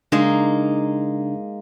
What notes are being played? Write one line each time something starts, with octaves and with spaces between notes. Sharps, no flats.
C#3 G#3 A#3 D4 D#4